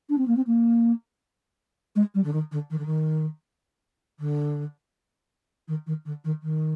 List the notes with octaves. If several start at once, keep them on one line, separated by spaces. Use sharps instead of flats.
D4
C4
A#3
C4
A#3
G#3
G3
D3
D#3
D3
D#3
D3
D#3
D3
D#3
D#3
D3
D#3
D#3